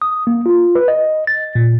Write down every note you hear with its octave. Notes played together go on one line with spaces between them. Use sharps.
D#6
A#3
F4
B4
D#5
A6
A#2